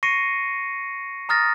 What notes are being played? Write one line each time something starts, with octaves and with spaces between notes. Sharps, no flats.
C#6 A#6 C7 C#7 D#7
A#5 D#6 F6 A6 A#6